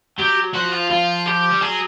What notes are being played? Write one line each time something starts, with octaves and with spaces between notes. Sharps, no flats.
F#3 G4
F3 F#4
F4
F4
G4
G3
F#3 G#4